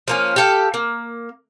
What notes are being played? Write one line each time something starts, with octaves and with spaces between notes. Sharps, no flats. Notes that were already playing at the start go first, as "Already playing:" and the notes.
F3 A#3 C#4
G4 A4 F5
A#3